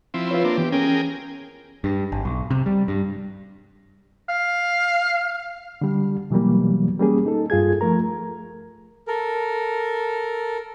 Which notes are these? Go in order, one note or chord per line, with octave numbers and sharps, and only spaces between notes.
F3 C4 E4
F4 B4 C#5
A#3 C4 D4
E3 B3 G4
C#4 G#4 A#4 G5
G2
G#1
B1
C3
G3
G2
F5
D3 G3
B2 E3 F#3 G3 A#3
G3 A#3 C#4 G#4
D#4 A4
G2 F4 G#4 G#6
F3 A3 A#4 A#5
A4 A#4